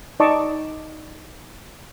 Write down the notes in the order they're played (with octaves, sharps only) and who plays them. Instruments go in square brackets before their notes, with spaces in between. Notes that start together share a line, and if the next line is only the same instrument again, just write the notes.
[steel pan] D#4 D5 D#5 A5 C#6 D6